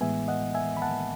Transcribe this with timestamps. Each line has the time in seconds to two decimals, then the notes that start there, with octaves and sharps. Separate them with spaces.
0.01 A2 E3 G#3 B3 E5 G#5
0.28 D#5 F#5
0.54 E5 G#5
0.77 B5
0.82 F#5 A5